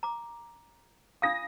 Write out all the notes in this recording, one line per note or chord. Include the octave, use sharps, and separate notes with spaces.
A#5 D6
D4 F4 F5 D#6 A#6